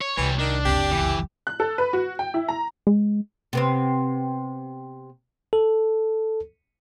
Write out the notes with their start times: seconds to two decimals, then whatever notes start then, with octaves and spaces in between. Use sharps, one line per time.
0.01 C#5
0.17 C2 E3 G3 C#5
0.39 D#3 D4
0.65 F#1 C#2 C4 G4
0.92 C2 E3 B3
1.47 F#6
1.60 A4
1.78 B4
1.93 F#4
2.19 G5
2.34 E4
2.48 A#5
2.87 G#3
3.53 C3 B3 C4
5.53 A4